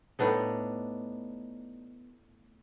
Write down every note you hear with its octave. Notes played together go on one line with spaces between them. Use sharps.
A2 B3 D4 D#4